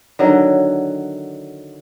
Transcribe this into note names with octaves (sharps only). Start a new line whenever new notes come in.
D3 D#3 F#3